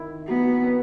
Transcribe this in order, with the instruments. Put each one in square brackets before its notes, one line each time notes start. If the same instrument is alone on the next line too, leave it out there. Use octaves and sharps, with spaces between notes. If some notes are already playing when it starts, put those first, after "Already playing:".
Already playing: [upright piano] D#3 E4
[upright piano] F#3 [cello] B3
[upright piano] B3